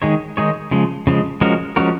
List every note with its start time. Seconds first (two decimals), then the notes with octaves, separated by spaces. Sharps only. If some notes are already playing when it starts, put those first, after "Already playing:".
0.02 D#3 G#3 D#4 G#4 C#5
0.37 D#3 G#3 D#4 G#4 C#5
0.71 C#3 F3 G#3
1.07 C#3 F3 G#3
1.41 F3 G#3 C#4 F#4 A#4
1.76 F3 G#3 C#4 F#4 A#4